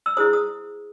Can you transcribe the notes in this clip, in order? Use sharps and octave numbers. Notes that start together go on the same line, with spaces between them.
E6
E4 G#4 C5 D#6
D#6